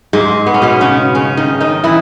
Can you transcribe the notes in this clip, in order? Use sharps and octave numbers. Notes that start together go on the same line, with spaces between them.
G#2 G#3
B3
C#4
B2 B3
C#3 C#4
C#3 C#4
D#3 D#4
D#3 D#4
E3 E4